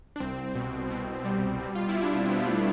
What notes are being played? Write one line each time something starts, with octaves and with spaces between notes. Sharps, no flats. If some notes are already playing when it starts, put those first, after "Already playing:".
D4
C2 C4
B2
B2
G3
B2
F4
E4
G3
D4
C4
G3 B3
A3